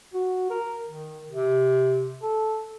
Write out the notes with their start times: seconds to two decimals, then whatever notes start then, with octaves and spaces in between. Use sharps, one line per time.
0.14 F#4
0.50 A#4
0.87 D#3
1.31 C3
2.22 A4